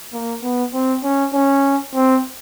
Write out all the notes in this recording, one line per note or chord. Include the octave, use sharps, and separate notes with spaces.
A#3
B3
C4
C#4
C#4
C4